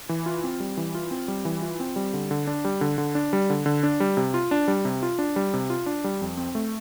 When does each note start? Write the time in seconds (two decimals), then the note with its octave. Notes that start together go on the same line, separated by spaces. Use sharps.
0.09 E3
0.26 F4
0.44 C4
0.60 G3
0.77 E3
0.95 F4
1.11 C4
1.28 G3
1.45 E3
1.62 F4
1.80 C4
1.96 G3
2.14 D3
2.31 D3
2.47 D4
2.65 G3
2.81 D3
2.98 D3
3.15 D4
3.33 G3
3.50 D3
3.66 D3
3.83 D4
4.00 G3
4.17 C3
4.34 F4
4.51 D4
4.68 G3
4.85 C3
5.03 F4
5.19 D4
5.36 G3
5.54 C3
5.70 F4
5.86 D4
6.04 G3
6.21 F2
6.37 C4
6.55 A3